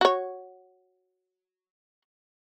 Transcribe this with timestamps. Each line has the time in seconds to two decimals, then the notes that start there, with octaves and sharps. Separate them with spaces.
0.01 F#4 C#5